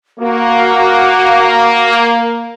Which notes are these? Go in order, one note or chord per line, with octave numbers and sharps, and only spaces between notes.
A#3 F#4